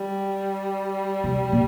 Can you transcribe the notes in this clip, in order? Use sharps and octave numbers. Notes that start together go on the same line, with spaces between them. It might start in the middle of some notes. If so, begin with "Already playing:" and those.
Already playing: G3
C3
A#2